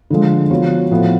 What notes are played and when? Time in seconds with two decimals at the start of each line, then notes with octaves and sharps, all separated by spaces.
0.10 D3 F3 G#3
0.50 F3 B3 F#4 C#5
0.91 A2 F3 B3